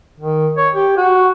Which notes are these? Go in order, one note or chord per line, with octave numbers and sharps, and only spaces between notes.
D#3
C#5
G4
F#4